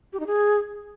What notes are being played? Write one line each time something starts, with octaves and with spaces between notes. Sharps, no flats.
G4
D#4
G#4